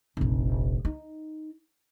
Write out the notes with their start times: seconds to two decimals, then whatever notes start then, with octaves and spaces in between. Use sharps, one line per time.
0.17 F1 A#1
0.85 D#4